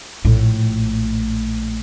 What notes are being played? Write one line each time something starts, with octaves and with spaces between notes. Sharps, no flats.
A#1 A2